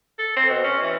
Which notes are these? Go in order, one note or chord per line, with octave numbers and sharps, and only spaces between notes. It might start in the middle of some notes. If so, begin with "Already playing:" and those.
A4
C4
B2
C#4
E3